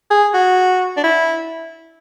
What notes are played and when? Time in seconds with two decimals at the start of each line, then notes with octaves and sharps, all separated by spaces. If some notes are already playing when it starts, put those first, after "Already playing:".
0.10 G#4
0.34 F#4
0.97 D4
1.04 E4